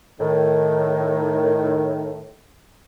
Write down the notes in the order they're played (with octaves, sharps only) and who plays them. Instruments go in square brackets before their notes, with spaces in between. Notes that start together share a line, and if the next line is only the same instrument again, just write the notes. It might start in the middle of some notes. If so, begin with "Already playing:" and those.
[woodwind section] A2 D#3